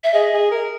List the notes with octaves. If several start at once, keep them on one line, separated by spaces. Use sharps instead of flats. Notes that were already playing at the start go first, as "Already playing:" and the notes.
E5
G#4 D#5
G#4
A#4